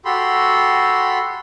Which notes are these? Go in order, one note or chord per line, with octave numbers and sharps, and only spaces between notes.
F#4 G4 A4 B5 C6